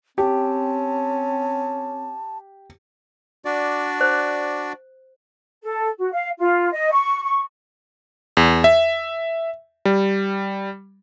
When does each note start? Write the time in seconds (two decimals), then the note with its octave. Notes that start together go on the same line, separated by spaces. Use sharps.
0.18 C4 C#4 G4 A5
3.45 D4 F#4 D5
4.01 C5
5.62 A4
5.98 F#4
6.12 F5
6.39 F4
6.72 D#5
6.92 C#6
7.23 C#6
8.37 E2
8.64 E5
9.85 G3